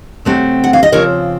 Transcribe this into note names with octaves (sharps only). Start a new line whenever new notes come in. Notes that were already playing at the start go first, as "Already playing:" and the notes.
C3 F#3 A3 C4
F#5
F5
D#5
C#3 F3 C4 A#4 C#5